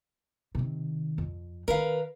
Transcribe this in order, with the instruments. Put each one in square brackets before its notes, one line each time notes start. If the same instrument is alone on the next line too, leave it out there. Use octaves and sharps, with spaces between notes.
[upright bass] C3 D#3
F2
[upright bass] D#3 C4 [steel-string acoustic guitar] A#4 B4 F5